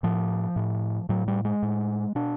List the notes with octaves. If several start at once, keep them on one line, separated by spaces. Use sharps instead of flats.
A2 F3
A2
A2 F#3
G3
G#3
A2
B2 D4